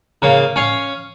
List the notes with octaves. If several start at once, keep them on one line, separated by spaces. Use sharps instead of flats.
C#3 A#3
C#4 F5